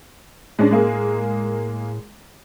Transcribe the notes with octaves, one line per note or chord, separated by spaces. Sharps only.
A2 G#3 C#4 D4
G#3 A#3 G#4